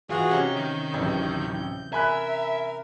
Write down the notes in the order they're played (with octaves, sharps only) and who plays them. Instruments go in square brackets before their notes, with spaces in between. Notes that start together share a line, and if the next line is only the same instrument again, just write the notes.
[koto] E3 A#5 [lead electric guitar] F4 [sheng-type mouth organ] F#4 G#4
[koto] C3 C#4 D#4 [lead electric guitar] G4
[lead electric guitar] D#3 [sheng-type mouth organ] G6
[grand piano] D1 A1 [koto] E3
[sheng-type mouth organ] A#4 [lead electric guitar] E5 [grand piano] G#5 B5 F#6